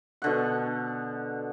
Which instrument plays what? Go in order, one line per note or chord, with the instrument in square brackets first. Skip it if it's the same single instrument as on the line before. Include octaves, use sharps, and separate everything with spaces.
[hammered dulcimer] B2 D3 F#5